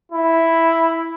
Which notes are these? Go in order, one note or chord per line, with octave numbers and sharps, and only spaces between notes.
E4